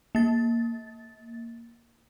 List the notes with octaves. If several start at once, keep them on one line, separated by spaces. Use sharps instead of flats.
A#3 A6